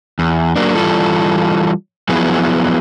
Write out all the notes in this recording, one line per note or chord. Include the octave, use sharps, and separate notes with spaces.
E2
F#3 A#3 D4
E3 G3 F4 A4
F3 F#3 B3 E4 G#4